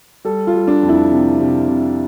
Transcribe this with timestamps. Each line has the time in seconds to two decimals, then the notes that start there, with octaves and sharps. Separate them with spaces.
0.25 G3 A4
0.47 F4
0.54 G3
0.68 D4
0.83 F2
0.89 E4
1.12 C3
1.40 C3
1.68 C3